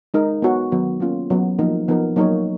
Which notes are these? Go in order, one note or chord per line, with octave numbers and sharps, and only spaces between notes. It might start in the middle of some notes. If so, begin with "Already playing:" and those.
G#3 D#4 A#4
B3 F#4 C#5
D#3 F#3 B3
A#3 C#4 F4
F#3 B3 F#4
F3 A#3 D#4 A#4
F3 B3 D#4 A#4
F#3 A#3 D#4 A#4 C#5